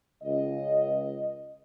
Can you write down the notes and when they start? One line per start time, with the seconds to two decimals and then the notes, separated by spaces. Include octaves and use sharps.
0.23 C#2 D#5